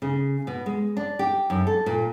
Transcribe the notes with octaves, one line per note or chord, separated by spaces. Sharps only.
C#3
B2
G#3
D4
G4
F#2
A4
A#2